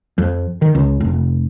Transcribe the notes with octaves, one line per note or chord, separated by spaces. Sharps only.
F2
D#3
C#2
F1